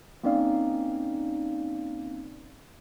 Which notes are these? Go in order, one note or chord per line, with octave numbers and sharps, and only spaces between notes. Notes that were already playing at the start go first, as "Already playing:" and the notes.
A#3 C4 C#4 D#4 D5 F5